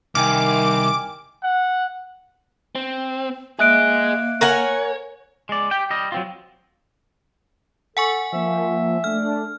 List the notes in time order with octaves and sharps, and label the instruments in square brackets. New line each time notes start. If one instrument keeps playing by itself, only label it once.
[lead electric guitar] C2 [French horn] D#3 [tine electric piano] G5 G#5 F6 [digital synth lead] D6
[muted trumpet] F#5
[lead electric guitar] C4
[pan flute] A#3 [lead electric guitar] G#4 D#5 [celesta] E5 F#6 D7
[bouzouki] A#4 F#5 G#5 [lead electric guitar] C#5
[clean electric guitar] G#3 D5
G4 G5
G3 D#5
F#3 C4 F4
[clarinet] A4 [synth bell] F#5 G#5 C#6
[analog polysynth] F3 A#3 [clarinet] E5
[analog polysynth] A3 D4 [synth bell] F6